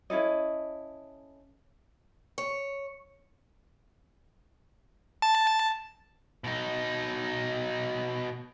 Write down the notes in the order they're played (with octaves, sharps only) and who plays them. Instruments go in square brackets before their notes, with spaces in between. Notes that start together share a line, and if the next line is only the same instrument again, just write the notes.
[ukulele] C#4 E4 A4 D#5
[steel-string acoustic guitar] C#5
[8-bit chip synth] A5
[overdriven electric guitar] B2 D#4